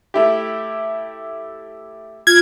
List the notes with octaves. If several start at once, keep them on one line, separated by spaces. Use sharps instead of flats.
A3 E4 G4
F4 G#6